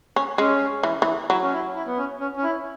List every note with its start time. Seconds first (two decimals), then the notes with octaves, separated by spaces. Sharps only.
0.16 C#4
0.38 G#3 C#4
0.83 E3
1.02 E3
1.30 F#3 E4
1.42 C#4
1.52 E4
1.75 E4
1.87 B3
1.98 C#4
2.20 C#4
2.36 C#4
2.44 E4